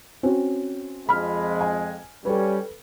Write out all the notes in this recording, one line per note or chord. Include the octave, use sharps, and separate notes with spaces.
C4 C#4 F#4
F2 G#3 B5 F6
G#5
G3 C#4 A4 B4